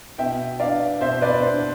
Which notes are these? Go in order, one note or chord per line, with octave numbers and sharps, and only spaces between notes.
B2 E5 G5
B3 D4 D5 F5
B2 C5 E5
B4 D5
B3 D4 C5